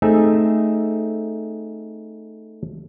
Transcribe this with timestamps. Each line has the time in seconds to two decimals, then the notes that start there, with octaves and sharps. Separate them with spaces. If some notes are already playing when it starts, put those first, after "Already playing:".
0.02 A3 C4 D#4 G#4 E5